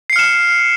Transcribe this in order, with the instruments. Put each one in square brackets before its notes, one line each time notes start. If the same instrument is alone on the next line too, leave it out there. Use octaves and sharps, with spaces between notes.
[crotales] C7
C#7
F6
E7